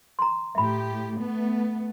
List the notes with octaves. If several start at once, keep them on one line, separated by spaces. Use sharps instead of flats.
A#5 C6
A2 G4 E5 B5
A3 B3